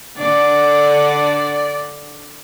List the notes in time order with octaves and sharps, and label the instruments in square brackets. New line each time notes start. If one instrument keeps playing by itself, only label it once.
[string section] D3 D4 F#5 [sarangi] D5